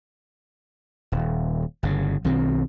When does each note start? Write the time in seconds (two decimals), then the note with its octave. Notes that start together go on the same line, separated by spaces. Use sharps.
1.12 D#1
1.83 G1 C#3
2.25 B1 D#3 C4